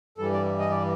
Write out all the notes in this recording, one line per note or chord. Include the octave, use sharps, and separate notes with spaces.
G2 E3 G3 A4
D5
D#5
D5